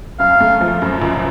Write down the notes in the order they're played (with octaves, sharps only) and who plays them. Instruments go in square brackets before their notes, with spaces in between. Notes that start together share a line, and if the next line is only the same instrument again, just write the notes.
[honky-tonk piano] F#2 [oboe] F5
[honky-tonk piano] A3
F3
F#2
C#2